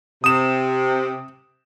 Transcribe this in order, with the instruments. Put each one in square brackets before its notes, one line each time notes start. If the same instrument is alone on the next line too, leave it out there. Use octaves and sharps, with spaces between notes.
[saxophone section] C3 [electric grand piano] D#6 E7